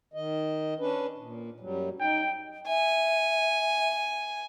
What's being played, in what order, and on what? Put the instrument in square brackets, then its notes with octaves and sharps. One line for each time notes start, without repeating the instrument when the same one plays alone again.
[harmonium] D#3 D#5
C#4 D4 B4
A#2
F#2 F#3 G3
[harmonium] D#4 [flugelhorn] G5
[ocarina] E5 [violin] G#5